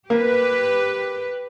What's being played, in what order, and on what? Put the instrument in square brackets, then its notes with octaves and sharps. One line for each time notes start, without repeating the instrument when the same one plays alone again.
[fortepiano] A#3 [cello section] G4 B4